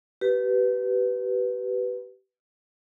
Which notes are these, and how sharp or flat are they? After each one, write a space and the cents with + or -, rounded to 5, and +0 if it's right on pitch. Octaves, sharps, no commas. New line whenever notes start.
G4 -30 B4 +0